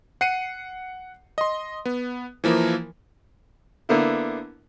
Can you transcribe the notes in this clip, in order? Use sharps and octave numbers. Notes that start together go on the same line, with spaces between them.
F#5 C7 C#7 D#7
D#5 C6
B3
E3 F3 A#3 E4 A#4
D3 A#3 B3 E4